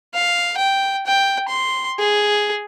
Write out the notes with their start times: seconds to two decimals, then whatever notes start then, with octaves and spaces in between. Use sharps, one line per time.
0.14 F5
0.57 G5
1.07 G5
1.48 C6
1.99 G#4